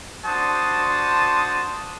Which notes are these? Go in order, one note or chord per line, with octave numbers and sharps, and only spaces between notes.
D4 F#4 C5 A5 C6 D#6